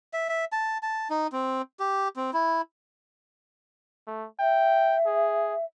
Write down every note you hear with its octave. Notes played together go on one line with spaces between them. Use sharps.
E5
E5
A5
A5
D#4
C4
G4
C4
E4
A3
E5 G5
G#4